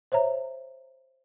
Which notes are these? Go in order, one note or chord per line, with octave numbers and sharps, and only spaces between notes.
C5 C#5 E5 A#5